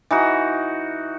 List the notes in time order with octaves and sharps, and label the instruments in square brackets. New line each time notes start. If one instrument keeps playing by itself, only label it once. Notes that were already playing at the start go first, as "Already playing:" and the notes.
[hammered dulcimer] E3 D#4 F#4